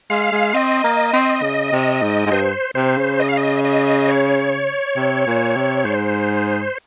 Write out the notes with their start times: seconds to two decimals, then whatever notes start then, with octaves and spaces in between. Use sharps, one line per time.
0.10 G#3 F5
0.32 G#3
0.54 C4 D#5
0.84 A#3
1.13 C4
1.42 C#3
1.72 C3
2.02 G#2
2.26 G#2
2.31 G2 C5
2.75 C3 C5
2.97 C#3
3.20 D#5
3.29 F5
3.37 D#5
3.64 D#5
4.08 C#5
4.96 C3
5.27 A#2
5.56 C3
5.85 G#2 C5